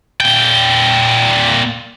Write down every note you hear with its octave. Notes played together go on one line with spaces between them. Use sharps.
A#2 G5